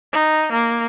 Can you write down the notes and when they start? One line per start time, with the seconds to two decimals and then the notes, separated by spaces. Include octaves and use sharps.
0.13 D#4
0.52 A#3